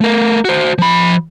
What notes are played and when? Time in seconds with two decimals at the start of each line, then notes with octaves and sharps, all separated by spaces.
0.01 A3 A#4
0.45 F#4 C5
0.78 F3 B5